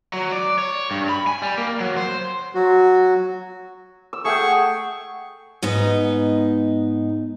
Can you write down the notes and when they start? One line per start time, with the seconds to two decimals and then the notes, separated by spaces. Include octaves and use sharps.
0.13 F#3
0.32 D5
0.58 C#5
0.91 G2
1.09 B5
1.27 G#5
1.42 G3
1.58 A#3
1.80 F#3
1.97 C5
2.54 F#3 F#4
4.13 E6
4.25 A3 G#4 F#5 G5 C#6
5.62 G#2 B3 D#4